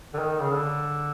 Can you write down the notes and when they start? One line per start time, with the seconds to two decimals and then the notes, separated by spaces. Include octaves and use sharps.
0.14 D3
0.19 D#3
0.42 C#3
0.53 D3